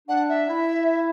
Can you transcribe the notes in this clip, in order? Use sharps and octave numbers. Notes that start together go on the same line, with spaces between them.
D4 F#5
E5
E4